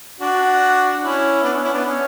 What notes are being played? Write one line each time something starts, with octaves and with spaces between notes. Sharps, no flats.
D4 F#4
C#4 E4
B3 D4
C#4
C#4 E4
B3 D4
C#4